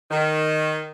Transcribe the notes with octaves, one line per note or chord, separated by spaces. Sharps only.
D#3